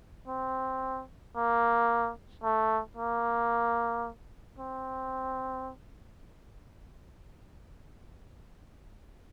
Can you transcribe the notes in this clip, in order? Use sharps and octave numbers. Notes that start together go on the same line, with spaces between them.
C4
A#3
A3
A#3
C4